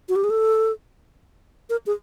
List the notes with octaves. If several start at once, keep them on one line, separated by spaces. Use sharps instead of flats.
F#4
G4
G#4
A4
A#4
G#4